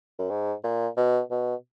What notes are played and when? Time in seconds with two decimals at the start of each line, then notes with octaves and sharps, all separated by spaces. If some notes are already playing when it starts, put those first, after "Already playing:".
0.18 F#2
0.30 G#2
0.64 A#2
0.97 B2
1.31 B2